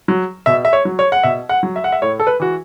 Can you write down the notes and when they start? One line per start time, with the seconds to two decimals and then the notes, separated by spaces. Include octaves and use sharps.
0.08 F#3
0.46 B2 E5
0.65 E5
0.73 C#5
0.85 F#3
0.99 C#5
1.12 F#5
1.23 B2 E5
1.49 F#5
1.63 F#3
1.76 E5
1.84 F#5
1.92 E5
2.02 A2 C#5
2.20 A4
2.27 B4
2.40 E3 F#4